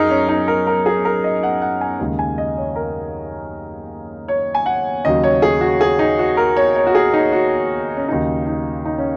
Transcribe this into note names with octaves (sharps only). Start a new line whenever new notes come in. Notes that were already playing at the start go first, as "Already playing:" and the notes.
Already playing: F#2 D#4 G#4 A#4
C#4
D#4
A#4
A#4
G#4
A#4
D#5
F#5
F#5
G#5
D#2 C#3 G#3
G#5
D#5
C#5
A#4
C#5
G#5
F#5
D#2 C#3 F#3 D#5
C#5
G#4
F#4
G#4
D#4
F#4
A#4
C#5
C#5
F#4
G#4
D#4
F#4
C#4
D#2 C#3 F#3 D#4
D#4
D#4
C#4